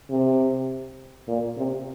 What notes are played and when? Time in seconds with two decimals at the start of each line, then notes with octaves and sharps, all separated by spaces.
0.11 C3
1.28 A#2
1.57 C3